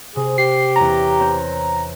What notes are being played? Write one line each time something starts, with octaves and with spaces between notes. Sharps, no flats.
C3 G#4
G4 C7
E2 C#4 A#5
C4 C#5 G6